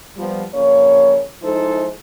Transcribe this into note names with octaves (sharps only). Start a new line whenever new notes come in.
F3 G3 B3
F2 C#3 A#3 C#5
F3 G#3 D#4 E4 A4 C5